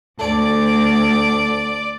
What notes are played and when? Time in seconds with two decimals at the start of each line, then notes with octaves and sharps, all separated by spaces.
0.20 D2 A4 D5